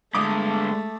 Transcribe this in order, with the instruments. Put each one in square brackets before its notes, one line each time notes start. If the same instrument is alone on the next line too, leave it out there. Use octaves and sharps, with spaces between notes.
[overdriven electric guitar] G2 D3 [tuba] G#3 [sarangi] A3 [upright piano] D6 D#6